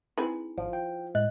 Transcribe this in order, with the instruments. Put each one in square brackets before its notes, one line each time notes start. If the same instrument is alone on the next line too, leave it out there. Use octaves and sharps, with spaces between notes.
[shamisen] C4 G#4 B4 [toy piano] D#4 E4 G#5
[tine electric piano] G#1 F4 [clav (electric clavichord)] F3
[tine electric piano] G5
[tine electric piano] A2 G#3 F#6 [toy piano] D#5